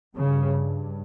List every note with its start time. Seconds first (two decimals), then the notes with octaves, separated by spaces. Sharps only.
0.17 G2 C#3